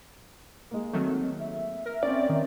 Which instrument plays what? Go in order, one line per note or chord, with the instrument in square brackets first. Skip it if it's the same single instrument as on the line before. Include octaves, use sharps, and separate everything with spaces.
[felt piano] G#3 A#3
[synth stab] D#3 F#3 A3 [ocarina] C4
[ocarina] E5
[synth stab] A#4
[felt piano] C4 C#4 [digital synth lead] D5
[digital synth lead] D#3